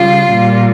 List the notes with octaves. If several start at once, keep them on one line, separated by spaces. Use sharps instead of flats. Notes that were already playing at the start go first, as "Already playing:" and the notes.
Already playing: C#3 G3 F4
A#2 G3